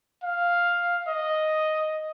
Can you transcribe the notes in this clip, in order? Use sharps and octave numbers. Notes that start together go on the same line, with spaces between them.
F5
D#5